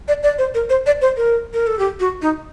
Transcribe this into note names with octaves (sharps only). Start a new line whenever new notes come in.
D5
D5
C5
A#4
C5
D5
C5
A#4
A#4
A4
G4
F#4
D#4